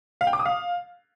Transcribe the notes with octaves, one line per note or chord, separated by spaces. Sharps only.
F5
G5
D6
D#6
F5